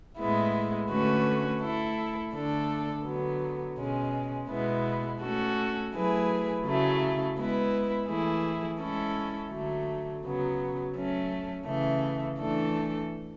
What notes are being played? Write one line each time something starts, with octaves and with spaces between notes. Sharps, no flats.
A2 G#3 B3 E4
D3 A3 C#4 F#4 B4
A3 E4 A4
D3 A3 D4 A4
D3 F#3 B3
B2 G#3 C#4
B2 G#3 B3 E4
A3 C#4 F#4 A4
F#3 A3 E4 G#4 B4
C#3 F#3 A3 E4
G#3 B3 E4 B4
E3 A3 E4 G#4
G#3 C#4 E4 A4
D3 F#3 A3
C#3 F#3 B3
F#3 A3 C#4
C#3 E3 A3
E3 A3 D4 A4